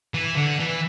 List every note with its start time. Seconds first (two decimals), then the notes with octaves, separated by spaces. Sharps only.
0.14 E3
0.36 D3
0.59 E3